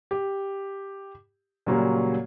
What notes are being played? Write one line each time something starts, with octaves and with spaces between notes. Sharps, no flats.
G4
A#2 C#3 F#3 G3 A#3 C#4